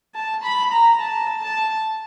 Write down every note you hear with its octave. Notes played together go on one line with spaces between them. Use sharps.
A5
B5
A#5
A5
A5